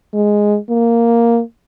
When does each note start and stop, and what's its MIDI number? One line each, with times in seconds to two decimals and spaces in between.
0.14 0.58 56
0.69 1.41 58